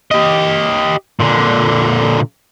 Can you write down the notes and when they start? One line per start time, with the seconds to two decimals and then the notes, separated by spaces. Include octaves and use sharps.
0.11 G4 D#5
1.20 A#2 D3